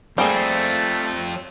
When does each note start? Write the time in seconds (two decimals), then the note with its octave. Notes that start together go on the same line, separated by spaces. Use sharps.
0.18 F3 G3 A3 A#3 C4 G#4